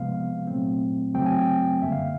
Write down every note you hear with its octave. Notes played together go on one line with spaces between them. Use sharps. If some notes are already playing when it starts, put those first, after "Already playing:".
Already playing: C3 F3 G#3 B3 F5
A#2 F#3 A3 C4
F2 C#3 F#3 A3 C4 G5
G#5
G5
F#2 D3 G3 A#3 E5
F5